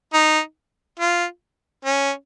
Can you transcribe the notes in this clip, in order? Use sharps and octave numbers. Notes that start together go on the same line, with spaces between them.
D#4
F4
C#4